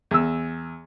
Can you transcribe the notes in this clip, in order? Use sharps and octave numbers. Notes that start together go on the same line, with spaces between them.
E2 E6